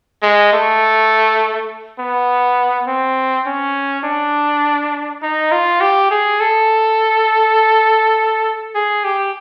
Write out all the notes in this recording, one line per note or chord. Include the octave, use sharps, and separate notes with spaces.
G#3
A3
B3
C4
C#4
D4
D#4
F4
G4
G#4
A4
G#4
G4